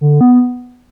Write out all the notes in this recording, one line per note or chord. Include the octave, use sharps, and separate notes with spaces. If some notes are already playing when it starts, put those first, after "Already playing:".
D3
B3